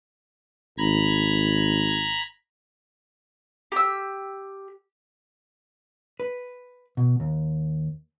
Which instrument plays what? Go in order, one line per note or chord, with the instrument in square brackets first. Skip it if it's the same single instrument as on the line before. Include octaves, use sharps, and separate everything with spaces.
[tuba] G#1 [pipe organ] A#5 B5 G#6
[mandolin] G4 E6
[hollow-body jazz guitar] B4
B2
D#2